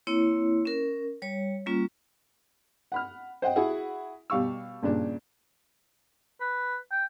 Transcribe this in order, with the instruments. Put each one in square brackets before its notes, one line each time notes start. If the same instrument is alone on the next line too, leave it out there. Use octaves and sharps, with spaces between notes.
[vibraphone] A#3 C4 E4 C#5
C#4 A#4
G3 C#5
G3 A#3 C#4 F4
[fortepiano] F#5 B5 F6
C5 D#5 F#5 G5
E4 F#4 G#4 E5 F#5
B2 G3 F5 C#6 E6
G2 A#2 C#3 D4
[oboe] B4
G5